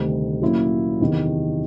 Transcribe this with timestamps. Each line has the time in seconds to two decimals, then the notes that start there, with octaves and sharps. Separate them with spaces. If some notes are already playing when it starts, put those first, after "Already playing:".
Already playing: D2 C3 D#3 G3
0.42 A#2 F#3 A#3 C#4 E4
1.01 E2 C3 D#3